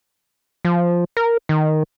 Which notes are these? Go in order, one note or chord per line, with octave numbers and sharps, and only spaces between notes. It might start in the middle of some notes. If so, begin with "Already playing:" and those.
F3
A#4
D#3